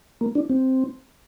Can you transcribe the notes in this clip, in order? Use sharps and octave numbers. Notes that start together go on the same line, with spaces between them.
A#3
D4
C4